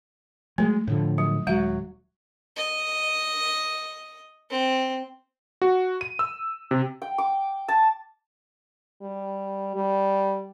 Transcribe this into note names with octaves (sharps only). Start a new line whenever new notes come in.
F#3 G#3 A3
A2 D3 F3
F#3
D#1 F#3 G#3 E5
D#5
C4
F#4
D#7
E6
C3
G5
D6
A5
G3
G3